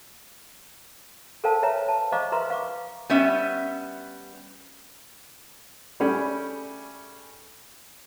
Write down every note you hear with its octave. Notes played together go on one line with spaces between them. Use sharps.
A4 A#4 C5 F5 G5 A5
B4 C#5 E5 G5 A#5
A5
C5 D#5 F5 A#5 C#6 D6
F4 A#4 B4 E5 A#5 C6
F5 C#6 D6
G3 B3 C#4 E5
G3 A3 C#4 G#4 G5 B5